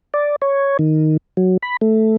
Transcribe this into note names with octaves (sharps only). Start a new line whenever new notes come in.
D5
C#5
D#3
F#3
B5
A3